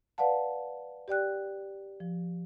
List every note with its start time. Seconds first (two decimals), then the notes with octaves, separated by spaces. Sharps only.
0.18 B4 D5 F5 F#5 A5
1.08 G4 D5 G5 F#6
2.00 F3